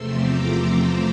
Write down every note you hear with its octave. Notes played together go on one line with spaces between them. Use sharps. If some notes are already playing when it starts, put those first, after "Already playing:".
Already playing: E2 C3 F3 A3 C4 C6 E6
A#5 D6